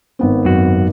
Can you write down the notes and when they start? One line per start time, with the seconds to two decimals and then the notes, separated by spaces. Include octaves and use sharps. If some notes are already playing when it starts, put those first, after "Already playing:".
0.19 G#1 B3 C4
0.45 F#2 F#4